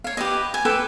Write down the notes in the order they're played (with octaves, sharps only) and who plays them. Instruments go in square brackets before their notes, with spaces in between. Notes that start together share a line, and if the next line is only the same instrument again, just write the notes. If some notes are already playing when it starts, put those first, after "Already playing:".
[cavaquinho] C#5 F5
G4 B4 D#5
G#5
A4 B4 G5 D6